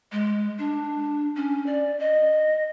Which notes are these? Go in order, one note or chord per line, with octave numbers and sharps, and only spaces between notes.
G#3
D4
C#4
D5
D#5